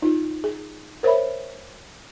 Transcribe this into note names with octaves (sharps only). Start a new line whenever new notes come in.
D#4 F4
G#4
A#4 C5 C#5 E5 B5